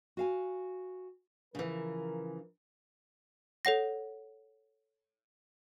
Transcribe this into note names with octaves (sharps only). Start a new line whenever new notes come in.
F#4 F5 G#5
C#3 E3 F3 A#4
A4 C#5 F#5 A#6